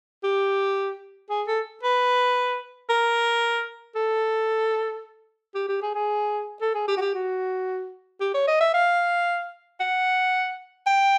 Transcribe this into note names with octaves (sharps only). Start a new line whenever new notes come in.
G4
G#4
A4
B4
A#4
A4
G4
G4
G#4
G#4
A4
G#4
G4
F#4
G4
F#4
G4
C#5
D#5
E5
F5
F#5
G5